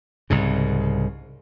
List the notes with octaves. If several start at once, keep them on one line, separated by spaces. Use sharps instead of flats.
C2 G#2 C#3